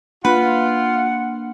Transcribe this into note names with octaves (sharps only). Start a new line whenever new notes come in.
A#3 D4 F4 B4 F#5